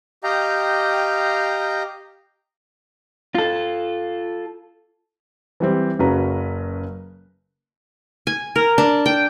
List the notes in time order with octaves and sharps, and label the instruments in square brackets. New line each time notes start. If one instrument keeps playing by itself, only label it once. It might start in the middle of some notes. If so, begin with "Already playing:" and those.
[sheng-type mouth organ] G4 D#5 F5 G5 A#5
[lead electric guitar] F4 A4
[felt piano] E3 G3 C4
F#1 C#3 F#3 B4 A#5
[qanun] G#5
A#4
D4
G5